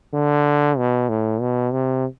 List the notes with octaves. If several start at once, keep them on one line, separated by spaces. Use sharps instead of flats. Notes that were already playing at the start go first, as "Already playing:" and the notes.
D3
B2
A2
B2
C3